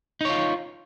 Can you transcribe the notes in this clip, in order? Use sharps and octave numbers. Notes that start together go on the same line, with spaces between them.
D#4 F4 C#5